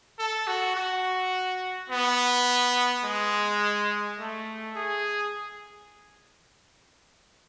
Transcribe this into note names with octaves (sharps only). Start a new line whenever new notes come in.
A4
F#4
F#4
B3
G#3
A3
G#4